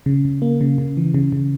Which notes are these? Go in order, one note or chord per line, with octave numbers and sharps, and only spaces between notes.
C#3
C#3
A#3
C#3
C#3
E3
C#3
C#3